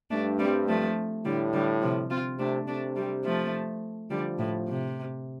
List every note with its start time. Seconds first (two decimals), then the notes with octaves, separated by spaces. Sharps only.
0.11 G2 A3 D4
0.39 G3 C4
0.68 F3 A3
1.25 A2 D3 G3
1.53 D3 G3
1.81 C3 F3
2.11 C4 F4
2.39 C3 A3 D4
2.67 C3 A3 D4
2.96 G3 C4
3.25 F3 A3
4.10 D3 F3 G3
4.39 A2
4.68 C3